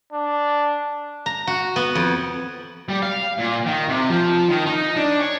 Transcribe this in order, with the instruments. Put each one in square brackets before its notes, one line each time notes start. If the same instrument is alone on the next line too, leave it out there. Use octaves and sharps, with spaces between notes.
[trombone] D4
[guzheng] A#5
F#4
B3
F2
[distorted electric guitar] G3
F5
A#2
D#3
C3
F3
D#3
D#4
D4
C#5